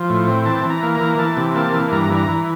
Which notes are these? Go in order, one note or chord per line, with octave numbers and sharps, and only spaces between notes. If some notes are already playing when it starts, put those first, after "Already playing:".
Already playing: F3
A2
C4
E3 A5
E3
A#5
A#3
A#5
E3
E3 A5
C3
A#3 A5
E3
G2 A#5
E3
A#5
E3